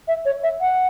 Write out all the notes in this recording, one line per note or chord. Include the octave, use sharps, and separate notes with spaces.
E5
C#5
E5
F#5